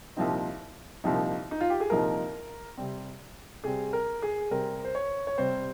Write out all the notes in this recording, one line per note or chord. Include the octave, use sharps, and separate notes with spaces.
C2 A#2 F3 C4 D#4
C2 A#2 F3 C4 D#4
D#4
F4
G4
G#4
C2 A#2 F3 C4 D#4 A#4
C3 G3 C4
C3 G3 C4 G#4
A#4
G#4
C3 G3 C4 A#4
C5
C#5
C#5
C3 G3 C4 C5